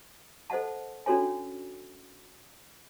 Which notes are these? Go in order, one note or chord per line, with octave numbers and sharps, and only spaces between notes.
A4 C5 D#5 F#5 A5
C#4 D4 F#4 A4 C#5 G#5